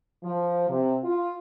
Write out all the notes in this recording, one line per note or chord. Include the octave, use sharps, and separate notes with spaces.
F3
C3
F4